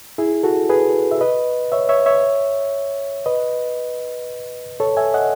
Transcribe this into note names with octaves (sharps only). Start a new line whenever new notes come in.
E4 G#4
F#4 A4
G#4 B4
E5
B4 D#5
C#5 E5
C#5 E5
C#5 E5
B4 D#5
A4 C#5
E5 G#5
D#5 F#5